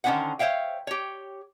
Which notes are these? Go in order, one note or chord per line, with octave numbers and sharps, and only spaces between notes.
D3 D#3 C#4 E4 C5 F#5
C5 C#5 E5 F5 G5
G4 C#5